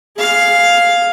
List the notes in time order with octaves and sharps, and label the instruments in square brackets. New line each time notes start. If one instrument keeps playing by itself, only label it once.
[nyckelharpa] G#4 F5